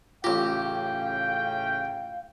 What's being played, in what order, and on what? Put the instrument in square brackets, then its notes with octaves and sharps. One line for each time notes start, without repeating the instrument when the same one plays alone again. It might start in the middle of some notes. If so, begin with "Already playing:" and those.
[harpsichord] A1 G4 [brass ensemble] A2 C#3 G5 [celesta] F4 [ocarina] F5